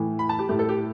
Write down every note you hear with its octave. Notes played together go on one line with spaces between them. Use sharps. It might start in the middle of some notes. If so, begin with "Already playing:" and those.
Already playing: A2 E3 A3
B5
A5
G4
A2 A3 G4
A4
G4